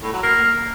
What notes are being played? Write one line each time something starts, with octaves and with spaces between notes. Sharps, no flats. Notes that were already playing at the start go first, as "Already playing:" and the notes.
A2
F#3
A#3